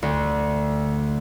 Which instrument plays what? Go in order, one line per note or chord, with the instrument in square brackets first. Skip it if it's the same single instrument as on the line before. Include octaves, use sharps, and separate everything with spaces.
[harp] D2